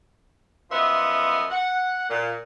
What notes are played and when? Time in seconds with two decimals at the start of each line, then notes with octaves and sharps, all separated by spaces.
0.71 F#2 F3 B3 D#5 E5 C6
1.50 F#5
2.10 A#2